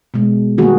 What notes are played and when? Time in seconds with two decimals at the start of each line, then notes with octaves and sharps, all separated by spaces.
0.14 B2 G#3
0.58 D#3 G3 A#3 F#4 G#4